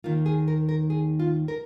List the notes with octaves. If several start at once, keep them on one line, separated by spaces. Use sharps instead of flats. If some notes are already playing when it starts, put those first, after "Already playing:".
D#2 D#3 A#3 F4
G#4
A#4
A#4
G#4
F4
A#4